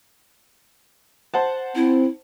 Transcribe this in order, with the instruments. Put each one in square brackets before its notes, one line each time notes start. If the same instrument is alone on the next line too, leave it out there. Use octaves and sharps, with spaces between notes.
[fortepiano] C5 F#5 A5
[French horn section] C4 [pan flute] E4